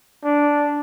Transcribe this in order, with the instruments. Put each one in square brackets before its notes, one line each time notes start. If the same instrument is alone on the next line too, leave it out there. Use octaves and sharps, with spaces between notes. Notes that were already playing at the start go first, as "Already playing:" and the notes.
[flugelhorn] D4